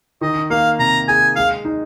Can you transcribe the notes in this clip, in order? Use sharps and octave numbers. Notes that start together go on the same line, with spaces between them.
D#3 D#5
A#3 F5
C3 A#5
G#4 G#5
G#3 F5
D#4